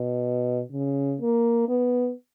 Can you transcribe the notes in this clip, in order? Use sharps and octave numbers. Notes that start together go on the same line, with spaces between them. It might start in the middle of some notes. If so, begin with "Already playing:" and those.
Already playing: B2
C#3
A#3
B3